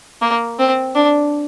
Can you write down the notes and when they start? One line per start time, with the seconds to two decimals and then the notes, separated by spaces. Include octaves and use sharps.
0.21 A#3
0.59 C4
0.95 D4